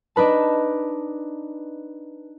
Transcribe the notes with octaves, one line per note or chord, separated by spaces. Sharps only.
D4 D#4 B4 A5